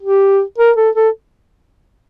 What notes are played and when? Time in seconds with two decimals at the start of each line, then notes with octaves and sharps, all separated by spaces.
0.02 G4
0.58 A#4
0.77 A4
0.95 A4